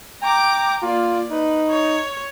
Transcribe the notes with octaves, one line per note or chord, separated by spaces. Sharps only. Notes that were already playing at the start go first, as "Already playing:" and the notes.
G5 A#5 D6
A#3 F4 D5
D#4 B4
C#5